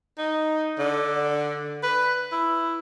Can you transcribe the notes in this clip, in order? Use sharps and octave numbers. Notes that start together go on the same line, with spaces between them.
D#4
D3
B4
E4